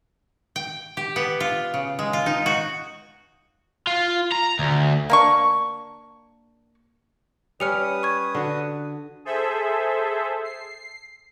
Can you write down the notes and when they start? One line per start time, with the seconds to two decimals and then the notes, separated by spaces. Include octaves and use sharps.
0.56 G5
0.97 G4
1.16 B3
1.40 F4
1.74 C#3
1.99 G#3
2.13 F4
2.26 D#4
2.46 F#4
3.87 F4
4.32 A#5
4.59 D2
5.10 A#3 D4 C#6
7.60 G3 C#4 B4 D#6 F6 C#7 F7
8.03 C#6 G#6
8.35 D3 F#4
9.25 G#4 A4 C5 E5
10.44 C7